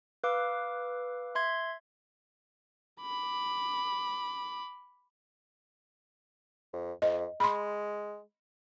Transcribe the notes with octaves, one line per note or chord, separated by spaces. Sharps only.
B4 F5 D6 E6
E5 C6 G#6
B5 D6
F2
F2 D#5
G#3 B5 C6